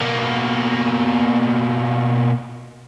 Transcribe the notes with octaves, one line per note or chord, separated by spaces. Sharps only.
B2 A#3